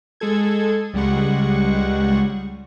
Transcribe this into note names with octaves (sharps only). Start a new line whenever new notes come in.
G#3 G#4 A4 G#6
C#2 G3 G#3 F#5 C#6